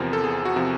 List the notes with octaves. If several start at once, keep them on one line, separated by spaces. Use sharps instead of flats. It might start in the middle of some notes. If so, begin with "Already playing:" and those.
Already playing: E2 C3 F3 A#4
A4
E2 G#4
F#4
C3 F3